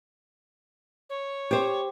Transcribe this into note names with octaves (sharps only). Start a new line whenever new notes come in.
C#5
G4 C5